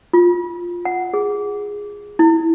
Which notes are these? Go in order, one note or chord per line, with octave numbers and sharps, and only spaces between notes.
F4
F#5
G#4
E4